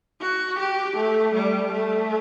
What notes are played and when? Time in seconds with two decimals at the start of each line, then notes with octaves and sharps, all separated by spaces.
0.21 F#4
0.59 G4
0.97 A3
1.34 G3
1.72 A3